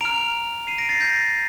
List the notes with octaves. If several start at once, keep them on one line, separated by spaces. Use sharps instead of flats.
A#5 F6 D7 F7
C7 D#7
A#6 D7
A6 C7
G6 A#6